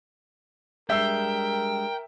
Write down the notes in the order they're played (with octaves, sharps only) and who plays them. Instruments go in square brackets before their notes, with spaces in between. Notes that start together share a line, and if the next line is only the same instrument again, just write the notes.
[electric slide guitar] G3 G#3 D4 [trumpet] A#4 [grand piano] E5 E6 C7 [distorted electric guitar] G5